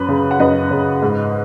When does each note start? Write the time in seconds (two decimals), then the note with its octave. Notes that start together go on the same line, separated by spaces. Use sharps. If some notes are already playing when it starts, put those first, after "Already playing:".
Already playing: F#2 B4
0.08 C#3
0.31 F#5
0.40 F#2 B4 D#5
0.71 C#3
1.02 G#2